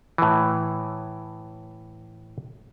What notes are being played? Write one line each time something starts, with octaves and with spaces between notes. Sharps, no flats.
A2 E3